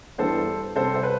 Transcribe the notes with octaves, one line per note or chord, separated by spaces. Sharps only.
G2 E3 G3 B3 A4 C5
C3 G3 C4 A4 C5
C5
B4